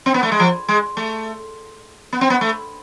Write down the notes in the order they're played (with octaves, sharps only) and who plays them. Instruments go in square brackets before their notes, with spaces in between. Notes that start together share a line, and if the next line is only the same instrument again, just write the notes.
[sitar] C4
B3
A3
G#3
F3
G#3
A3
B3
C4
B3
A3